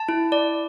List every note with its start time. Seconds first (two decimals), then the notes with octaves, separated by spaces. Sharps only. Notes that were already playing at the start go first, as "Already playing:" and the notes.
Already playing: A5
0.09 E4
0.32 D5